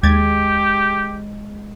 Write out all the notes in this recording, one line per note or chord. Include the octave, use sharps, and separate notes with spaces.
D#2 G#3 G4 G#6 A6